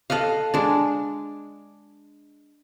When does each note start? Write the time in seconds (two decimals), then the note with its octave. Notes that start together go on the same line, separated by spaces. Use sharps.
0.10 A4 B4 D#5 F5
0.54 G#3 D4